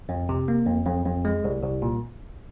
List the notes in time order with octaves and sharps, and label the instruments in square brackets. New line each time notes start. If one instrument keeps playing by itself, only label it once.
[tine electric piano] F2
C3
A#3
F2
F2
F2
G#3
C2
C2
A#2